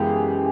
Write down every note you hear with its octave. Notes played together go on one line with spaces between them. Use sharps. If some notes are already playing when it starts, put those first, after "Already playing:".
Already playing: F#2 C#3 E3 G#3 B3 G4 G#4